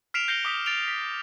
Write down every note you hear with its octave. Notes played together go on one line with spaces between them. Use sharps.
F6 B6 C7 D7 E7 F7
G6 A#6 C7 C#7 F7 G7
D6 D#6 B6
A6 D7 F7 G7
B6